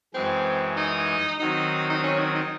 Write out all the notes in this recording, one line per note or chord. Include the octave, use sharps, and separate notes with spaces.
F#2 E3 G#3 C4
D#4
D#3 F#3 C4 D#4
D#4
C#4
D#4
D#4